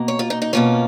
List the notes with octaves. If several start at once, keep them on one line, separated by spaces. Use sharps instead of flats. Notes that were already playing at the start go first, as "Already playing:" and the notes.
Already playing: B2 A#3
C#5
F4
D#4
D#4
B2 A#3 C#4 F4